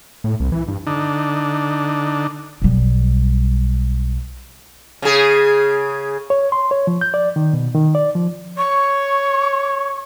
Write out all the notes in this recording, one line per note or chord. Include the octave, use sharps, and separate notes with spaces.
A2
C2
E3
G2
D3 D4 D#4
B1 G3
C#3 G#4
C#5
C6
C#5
F3
G6
D5
D#3
B2
D#3
D5
F3
C#5 C#6